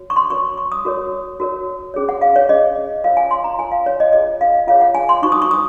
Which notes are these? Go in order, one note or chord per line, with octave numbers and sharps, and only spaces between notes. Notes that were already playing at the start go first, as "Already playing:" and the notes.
Already playing: F#4 C#5
C#6
C6
F#4 A#4 C#5 C#6
C#6
D#6
F#4 A#4 C#5
F#4 A#4 C#5
C#4 G#4 C#5
F#5
F5
C#5
C#4 G#4 C#5 D#5
F4 A#4 C#5 F5
G#5
C6
A#5
F4 A#4 C#5 G#5
F5
C#5
D#5
F4 G#4 C#5 D#5
F5
F4 G#4 C#5 F5
F#5
G#5
C6
D#4 F#4 C5 C#6
D#6
C#6
D#6